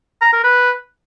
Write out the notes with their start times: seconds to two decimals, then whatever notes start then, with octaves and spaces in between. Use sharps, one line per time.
0.22 A#5
0.33 A#4
0.44 B4